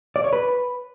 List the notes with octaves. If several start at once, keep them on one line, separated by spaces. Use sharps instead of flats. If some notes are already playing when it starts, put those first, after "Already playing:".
D5
C#5
B4